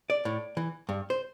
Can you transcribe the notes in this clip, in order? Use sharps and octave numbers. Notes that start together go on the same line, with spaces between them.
D5
A2
E3
G2
C5